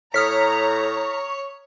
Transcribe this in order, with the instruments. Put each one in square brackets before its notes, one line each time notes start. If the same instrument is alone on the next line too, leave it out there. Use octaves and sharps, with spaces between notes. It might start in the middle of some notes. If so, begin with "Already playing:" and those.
[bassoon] A2 [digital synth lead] C#5 [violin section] A#5 [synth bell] D#6 F6 B6